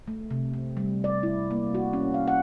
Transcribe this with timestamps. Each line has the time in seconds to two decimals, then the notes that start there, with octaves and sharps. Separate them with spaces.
0.08 A3
0.31 C3
0.54 C4
0.77 G3
1.04 D5
1.23 E4
1.51 A#3
1.75 F#4
1.93 C#4
2.14 F5
2.28 F#5